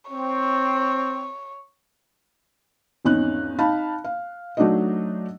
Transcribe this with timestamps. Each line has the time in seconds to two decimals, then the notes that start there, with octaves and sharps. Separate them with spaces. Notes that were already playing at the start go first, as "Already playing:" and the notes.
0.11 C4 C#5
3.05 G#1 E2 C#4 D#4 F#6
3.59 D#4 F5 A5 B5
4.04 F5
4.57 F#3 A3 D4 D#4 F#4 D#5